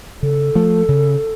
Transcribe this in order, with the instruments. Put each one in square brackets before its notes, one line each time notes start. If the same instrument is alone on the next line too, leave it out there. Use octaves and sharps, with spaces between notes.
[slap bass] C#3 [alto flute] A4
[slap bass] F3 A3
C#3